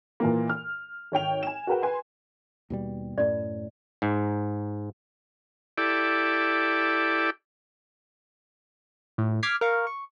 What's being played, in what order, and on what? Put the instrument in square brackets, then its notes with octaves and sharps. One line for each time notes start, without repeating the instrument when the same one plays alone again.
[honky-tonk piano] A#2 E3 A#3
F6
G#1 C#5 G5 F7
G#5 E7
F#4 G#4 A#4 B4 G5
B4 G#5 C6
[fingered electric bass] D#2 B2 G3
[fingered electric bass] F#2 A2 [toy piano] D5
[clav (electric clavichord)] G#2
[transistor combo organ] E4 G4 A4 D5
[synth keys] A2
D6 F6 G#6 B6 C7
A#4 F5 C#6
C#6